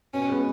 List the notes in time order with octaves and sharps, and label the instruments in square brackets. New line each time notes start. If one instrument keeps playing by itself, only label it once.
[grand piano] B2 [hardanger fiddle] C#4
[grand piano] G#3 B3